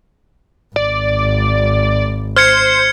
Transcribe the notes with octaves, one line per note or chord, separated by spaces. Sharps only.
G#1 D5
C5 F6 G#6 C#7